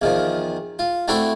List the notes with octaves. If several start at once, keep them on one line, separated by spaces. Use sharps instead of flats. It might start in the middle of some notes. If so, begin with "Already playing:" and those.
E2 D#3 F3
F4
A3 C4 D4 E4 F#4 A4